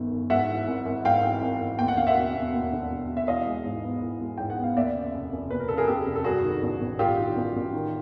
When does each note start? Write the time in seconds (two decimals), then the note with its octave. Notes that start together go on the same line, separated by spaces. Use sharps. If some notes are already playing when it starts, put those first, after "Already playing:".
Already playing: G1 F#2 D#3
0.11 G1
0.30 G#2 E5 F#5
0.49 E3
0.68 G#1
0.86 G#1
1.05 G#2 F5 G5
1.23 E3
1.42 G#1
1.61 G#1
1.79 D#2 G5
1.88 F#5
1.97 D3 F5
2.07 E5 F#5
2.17 E1
2.35 E1
2.53 D#2
2.73 D3
2.91 E1
3.09 E1
3.17 E5
3.27 E3 D#5 F5
3.46 G#3
3.65 G#2
3.83 B3
4.02 E3
4.20 G#3
4.38 G#2 G5
4.50 F#5
4.58 B3
4.63 F5
4.76 D#2 D5 E5
4.94 C#3
5.14 F1
5.32 F1
5.51 D#2 B4
5.60 A#4
5.68 C#3 A4
5.77 G#4 A#4
5.87 F1 G4 A4
6.07 F1
6.16 A4
6.24 G2 F#4 G#4
6.44 D#3
6.62 A1
6.80 A1
6.99 G2 F4 G4
7.18 D#3
7.36 A1
7.56 A1
7.73 D#3